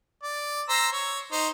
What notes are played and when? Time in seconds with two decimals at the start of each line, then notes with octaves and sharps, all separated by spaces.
0.23 D5
0.69 C5 A#5 E6
0.92 C#5
1.32 D#4 C5